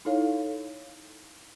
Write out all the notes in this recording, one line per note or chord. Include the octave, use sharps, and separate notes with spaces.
D#4 E4 A4 C#5 F5